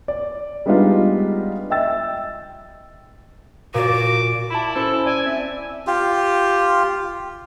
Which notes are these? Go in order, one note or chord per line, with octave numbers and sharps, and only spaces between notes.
D5
G3 G#3 B3 D4 D#4 F4
D#5 E5 G5 E6 A6
A#2 F#4 D5 D6
E4 A5 B5
C#4 E4 A4 C5
D5 G#5 D7
C4 E5
F4 G4